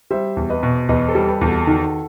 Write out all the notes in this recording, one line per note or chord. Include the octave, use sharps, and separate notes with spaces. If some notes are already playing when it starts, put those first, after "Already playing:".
G3 C5 E5
E2
B4 D#5
B2
E2 B4 D#5
A4 C5
G3
G4 B4
E2
F#4 A4
D#3 F#4 A4